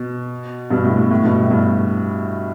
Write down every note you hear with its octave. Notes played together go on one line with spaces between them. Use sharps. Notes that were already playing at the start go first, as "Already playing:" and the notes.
Already playing: B2
G2 B2
A2
A2
A2
G2 B2
A2
G2